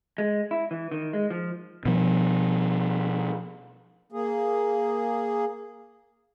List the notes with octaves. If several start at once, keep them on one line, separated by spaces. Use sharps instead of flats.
G#3
E4
E3
D#3
G#3
F3
B2 F3
A#3 G#4